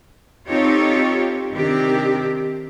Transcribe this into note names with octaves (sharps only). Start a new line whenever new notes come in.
C4 D#4 F4 G4 A4 C#5
C3 D#3 C4 D4 G4